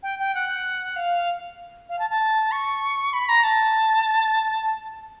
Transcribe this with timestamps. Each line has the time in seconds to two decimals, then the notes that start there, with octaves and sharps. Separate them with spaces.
0.02 G5
0.19 G5
0.34 F#5
0.96 F5
1.89 F5
1.99 A5
2.09 A5
2.51 C#6
3.13 B5
3.28 A#5
3.43 A5